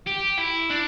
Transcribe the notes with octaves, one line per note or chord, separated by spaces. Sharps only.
G4
E4
D4